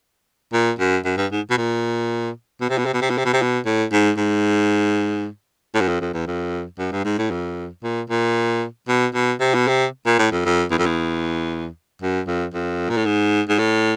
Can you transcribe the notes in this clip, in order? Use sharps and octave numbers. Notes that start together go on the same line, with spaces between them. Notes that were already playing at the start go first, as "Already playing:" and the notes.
A#2
F#2
F#2
G2
G#2
B2
A#2
B2
C3
B2
C3
B2
C3
B2
C3
B2
C3
B2
A2
G#2
G#2
A2
F#2
F2
F2
E2
F2
F#2
G2
G#2
A2
F2
A#2
A#2
B2
B2
C3
B2
C3
A#2
A2
F2
F2
E2
F2
E2
F#2
F2
F2
A#2
A2
G#2
G#2
A2